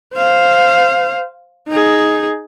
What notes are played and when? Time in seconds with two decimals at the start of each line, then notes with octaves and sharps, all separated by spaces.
0.15 C5 F5
1.69 D#4 G#4